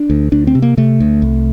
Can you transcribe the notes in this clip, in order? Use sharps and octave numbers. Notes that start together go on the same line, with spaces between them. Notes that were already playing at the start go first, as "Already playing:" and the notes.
Already playing: D4
D2
D2 D4
C4
C3
A#3
C3 A3
D2
C2